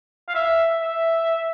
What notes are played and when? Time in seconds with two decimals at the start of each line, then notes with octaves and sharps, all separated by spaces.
0.28 F5
0.35 E5
0.80 E5